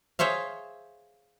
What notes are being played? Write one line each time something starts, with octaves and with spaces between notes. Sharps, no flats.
G#4 C5 C#5 E5 F5